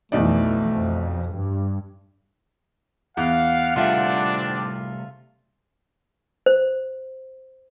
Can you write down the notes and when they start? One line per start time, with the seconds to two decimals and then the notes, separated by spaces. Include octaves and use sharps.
0.12 B1 F2 E3 A3 D#4 D5
0.71 F2
1.35 G2
3.17 E2 F5 F#5
3.76 C3 G3 A3 C4 D4 F4 E5
6.46 C5